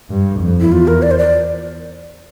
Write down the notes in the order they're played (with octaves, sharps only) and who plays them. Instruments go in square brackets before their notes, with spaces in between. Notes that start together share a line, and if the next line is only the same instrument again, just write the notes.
[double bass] G2
F2
[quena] E4
[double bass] E2 [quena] F4
[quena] A#4
D5
C5
D5